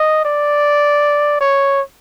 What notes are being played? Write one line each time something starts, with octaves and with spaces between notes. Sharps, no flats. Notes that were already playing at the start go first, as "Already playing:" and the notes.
Already playing: D#5
D5
C#5